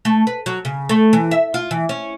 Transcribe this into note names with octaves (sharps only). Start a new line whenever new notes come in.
A3
B4
F#3
C#3
A3
E3
E5
F4
E3
C#4